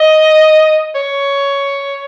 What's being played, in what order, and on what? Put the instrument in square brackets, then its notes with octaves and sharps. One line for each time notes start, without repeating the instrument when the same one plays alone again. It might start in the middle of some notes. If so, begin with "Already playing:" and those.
Already playing: [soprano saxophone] D#5
C#5